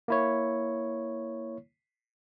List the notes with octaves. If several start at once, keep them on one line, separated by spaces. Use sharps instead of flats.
A#3 E4 C#5